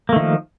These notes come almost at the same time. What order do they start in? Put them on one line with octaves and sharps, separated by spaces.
A#3 A3 D#3 F3